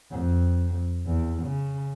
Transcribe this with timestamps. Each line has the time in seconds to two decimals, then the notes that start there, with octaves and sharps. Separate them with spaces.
0.11 F2
1.06 E2
1.43 C#3